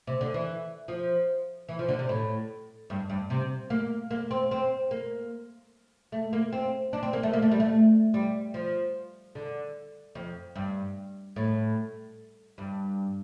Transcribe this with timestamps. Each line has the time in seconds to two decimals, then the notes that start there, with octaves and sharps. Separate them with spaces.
0.07 C3
0.21 D3
0.34 E3
0.88 F3
1.69 E3
1.79 F3
1.89 D3
1.99 C3
2.09 A2
2.90 G2
3.10 G2
3.30 C3
3.70 A#3
4.11 A#3
4.31 C4
4.51 C4
4.91 A#3
6.12 A3
6.33 A#3
6.53 C4
6.93 D4
7.03 C4
7.13 A#3
7.23 A3
7.34 A#3
7.42 A3
7.52 G3
7.60 A3
8.14 G3
8.54 F3
9.35 D3
10.15 F2
10.56 G2
11.36 A2
12.58 G2